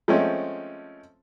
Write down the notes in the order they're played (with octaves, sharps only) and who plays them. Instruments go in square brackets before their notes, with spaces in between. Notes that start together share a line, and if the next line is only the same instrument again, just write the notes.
[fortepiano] F3 G#3 A3 C4 C#4